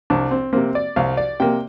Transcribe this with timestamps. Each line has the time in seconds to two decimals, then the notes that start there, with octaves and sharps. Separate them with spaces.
0.10 C2 D4
0.31 C4
0.53 C3 A#3 C4
0.75 D5
0.96 C2 F5
1.17 D5
1.40 C3 A#3 G5